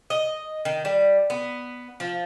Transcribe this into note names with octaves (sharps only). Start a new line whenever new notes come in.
D#5
D#3
G3
B3
F3